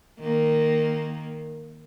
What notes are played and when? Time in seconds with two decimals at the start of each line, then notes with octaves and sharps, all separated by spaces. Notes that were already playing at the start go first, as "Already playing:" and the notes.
0.20 D#3 A#3